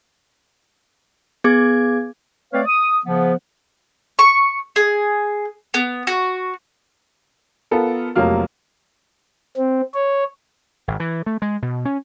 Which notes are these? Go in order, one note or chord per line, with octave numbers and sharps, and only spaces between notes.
B3 G#4 D6 G#6
A3 C4 B4 C#5 D5 F5
D#6
C#3 F3 B3
C#6
G#4
B3
F#4
B3 F4 A4 A#4
F1 F2 C3 F#3 A#3 F6
C4
C#5
G#1
E3
A3
G#3
B2
C#4